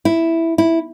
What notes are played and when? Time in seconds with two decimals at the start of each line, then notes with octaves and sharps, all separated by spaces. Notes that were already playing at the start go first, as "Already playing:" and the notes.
0.05 E4
0.58 E4